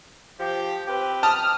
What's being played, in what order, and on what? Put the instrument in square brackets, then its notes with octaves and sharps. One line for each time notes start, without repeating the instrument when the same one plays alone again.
[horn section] F3 G4
C4 G4 B4
[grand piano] A5 [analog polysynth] D#6 F6